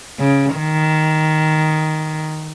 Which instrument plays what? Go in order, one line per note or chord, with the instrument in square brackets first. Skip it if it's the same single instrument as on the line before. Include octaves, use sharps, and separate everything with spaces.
[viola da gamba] C#3
D#3